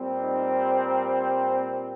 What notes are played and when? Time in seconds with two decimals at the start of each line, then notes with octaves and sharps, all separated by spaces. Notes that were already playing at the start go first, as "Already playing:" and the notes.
Already playing: A#2 G3 C4
0.20 D#4
0.53 G4
0.86 A#4